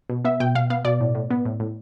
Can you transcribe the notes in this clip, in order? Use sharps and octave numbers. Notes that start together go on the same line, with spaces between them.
B2
B3 E5
B2 G5
B2 F5
B3 F5
B2 D5
A2
A2
B3
A2
A2